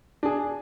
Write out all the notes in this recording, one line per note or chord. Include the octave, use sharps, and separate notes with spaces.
D4 G#4